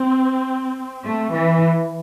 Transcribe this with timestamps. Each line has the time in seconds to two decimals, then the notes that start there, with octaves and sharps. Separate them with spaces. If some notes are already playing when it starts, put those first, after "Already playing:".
Already playing: C4
1.05 A3
1.33 E3